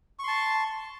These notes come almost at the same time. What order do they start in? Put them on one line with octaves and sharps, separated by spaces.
C#6 C6 A5